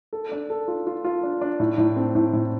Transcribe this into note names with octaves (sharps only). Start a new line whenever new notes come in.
A4
D4
A4
F4
F4
F4
D4
D4
A2
A2
C4
A2
A2